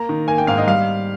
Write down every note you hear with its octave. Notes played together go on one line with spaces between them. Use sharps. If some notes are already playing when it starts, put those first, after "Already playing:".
Already playing: A#3 A#5
D#3
A#3 G#5
G5
G#2 F5
D#5
G3 F5